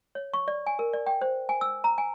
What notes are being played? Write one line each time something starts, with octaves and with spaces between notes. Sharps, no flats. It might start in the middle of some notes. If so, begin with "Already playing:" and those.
C#5
C#6
D5
G#5
A#4
D5
G5
C5
G#5
E6
A#5
G#5